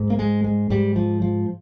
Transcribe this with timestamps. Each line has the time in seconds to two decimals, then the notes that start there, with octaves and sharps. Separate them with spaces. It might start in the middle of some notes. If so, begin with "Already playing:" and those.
Already playing: G#2
0.10 A#3
0.19 G#3
0.44 G#3
0.70 G#2 G3
0.96 F3
1.22 F3